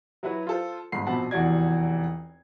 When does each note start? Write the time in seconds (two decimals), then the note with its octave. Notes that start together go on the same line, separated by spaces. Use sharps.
0.23 F#3 E4 F#4 B4
0.47 F4 A4 C5
0.92 G1 G#2 B5 C7
1.07 A#1 B2 C4 F#5 A5 B5
1.31 F1 E2 E3 F#4 D5 G#6